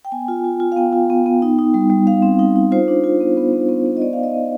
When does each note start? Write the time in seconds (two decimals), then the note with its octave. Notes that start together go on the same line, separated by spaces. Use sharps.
0.05 G5
0.12 B3 G#5
0.28 F4
0.44 F4
0.60 F4
0.72 F5
0.76 B3 G5
0.93 F4
1.10 B3
1.26 B3
1.42 D#4
1.59 D#4
1.74 G3
1.90 G3
2.07 G3 F5
2.22 C4
2.39 D#4
2.56 D#4
2.72 F4 C5
2.88 D4
3.04 F4
3.21 B3
3.37 B3
3.53 B3
3.69 B3
3.86 B3
3.97 D#5
4.02 B3 D5
4.13 F5
4.18 D#4
4.23 D#5
4.34 B3